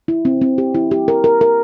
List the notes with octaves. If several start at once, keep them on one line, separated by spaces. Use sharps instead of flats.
E4
C4
C4
G4
E4
G4
A#4
A#4
A#4